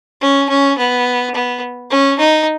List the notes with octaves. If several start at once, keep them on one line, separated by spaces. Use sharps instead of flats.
C#4
C#4
B3
B3
C#4
D#4